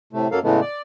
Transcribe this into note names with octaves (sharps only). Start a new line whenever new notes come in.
A2 C3 A3
F#2 F#3 A#3 A4 F5
A2 C#3 E3 G#3 A3 B3
D5